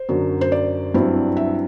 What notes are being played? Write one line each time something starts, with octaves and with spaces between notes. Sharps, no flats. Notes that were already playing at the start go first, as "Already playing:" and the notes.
Already playing: C5
F#2 D3 F#3
C5
D5
G2 F#3 C4 E4
E5